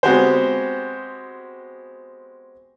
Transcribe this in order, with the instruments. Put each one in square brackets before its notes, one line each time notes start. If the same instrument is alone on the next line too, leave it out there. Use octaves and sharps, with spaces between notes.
[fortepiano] G#3 B3 C4 F#4 G4 C5